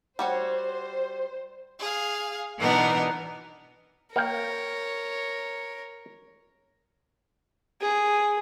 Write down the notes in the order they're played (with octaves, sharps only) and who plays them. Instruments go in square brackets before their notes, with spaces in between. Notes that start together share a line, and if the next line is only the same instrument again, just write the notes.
[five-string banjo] G3 F#4 C#5 [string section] C5
[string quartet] G#4 F5
B2 E3 B3 D4 D#4 A#4
[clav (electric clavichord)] A#3 F5 G5 [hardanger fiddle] A#4 C#5
[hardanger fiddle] G#4